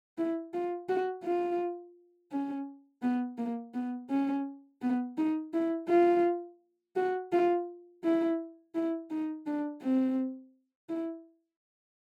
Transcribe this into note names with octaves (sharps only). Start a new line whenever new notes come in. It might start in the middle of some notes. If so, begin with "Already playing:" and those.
E4
F4
F#4
F4
C#4
B3
A#3
B3
C#4
B3
D#4
E4
F4
F#4
F4
E4
E4
D#4
D4
C4
E4